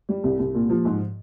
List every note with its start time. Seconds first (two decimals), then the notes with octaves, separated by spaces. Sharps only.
0.09 G3
0.24 C2
0.39 C2
0.55 A#2
0.70 F3
0.85 G#2